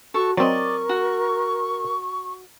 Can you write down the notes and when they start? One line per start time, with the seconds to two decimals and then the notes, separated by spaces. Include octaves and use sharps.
0.14 F#4 A4 C#6
0.37 F#3 C4 A#4 D5 D#5 C#6
0.89 F#4